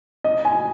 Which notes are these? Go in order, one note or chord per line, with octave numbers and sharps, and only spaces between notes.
D#5
G#5